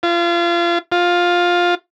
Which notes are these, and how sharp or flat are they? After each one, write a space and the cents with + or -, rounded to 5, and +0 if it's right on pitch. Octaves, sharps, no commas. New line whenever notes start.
F4 -30
F4 +10